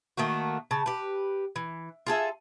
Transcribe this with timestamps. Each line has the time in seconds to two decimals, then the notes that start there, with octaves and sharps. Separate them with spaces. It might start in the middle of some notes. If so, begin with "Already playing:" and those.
0.17 D#3 A3 A#3 F#4
0.71 C#3 A5
0.86 G4 B4
1.56 E3
2.07 F4 G#4 A4 E5